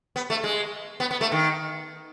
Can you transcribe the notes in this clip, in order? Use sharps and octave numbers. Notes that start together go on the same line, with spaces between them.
B3
A3
G#3
B3
B3
A3
D#3